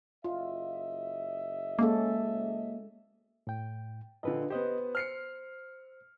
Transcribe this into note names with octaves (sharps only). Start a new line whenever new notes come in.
F#1 F4 D#5 E5
G#3 A#3 C#4 A4
A2 G5
A#1 D3 F4 B4 D#5
B3 G4 B4 C5 D#5
C5 F6 C7 C#7